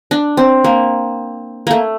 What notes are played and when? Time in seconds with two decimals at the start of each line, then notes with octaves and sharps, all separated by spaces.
0.11 D4
0.37 C4
0.64 A#3
1.67 A3 A#3